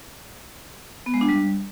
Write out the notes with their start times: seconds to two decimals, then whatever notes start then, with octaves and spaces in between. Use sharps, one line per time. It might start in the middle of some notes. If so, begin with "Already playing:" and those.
1.06 B3
1.14 G#3
1.21 D4
1.29 G3